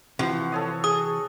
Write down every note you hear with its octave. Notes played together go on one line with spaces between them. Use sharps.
C3 E3 F3 F#4
A4 C#5 D#5
G#4 D#6